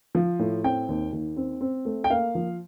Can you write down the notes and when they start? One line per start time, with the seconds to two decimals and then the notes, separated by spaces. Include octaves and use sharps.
0.15 F3
0.39 A2
0.63 C4 G5
0.89 D#2
1.13 D#2
1.37 C4
1.61 C4
1.85 A3
2.04 G5
2.10 A#3 F5
2.35 F3